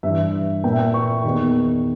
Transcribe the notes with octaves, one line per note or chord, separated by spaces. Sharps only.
G2 E3 E5
A#2 G5
E5
G5
C#6
E2 D#3